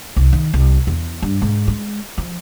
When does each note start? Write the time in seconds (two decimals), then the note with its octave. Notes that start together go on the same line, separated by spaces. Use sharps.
0.16 C2
0.33 D#3
0.53 C2
0.87 E2
1.22 G2
1.42 G#2
1.67 G#3
2.18 F3